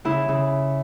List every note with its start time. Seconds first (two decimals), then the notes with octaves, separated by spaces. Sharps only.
0.05 C#3 E4
0.28 C#3